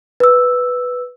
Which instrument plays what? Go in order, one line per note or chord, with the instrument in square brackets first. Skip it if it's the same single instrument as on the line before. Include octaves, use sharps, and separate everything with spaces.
[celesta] B4 E6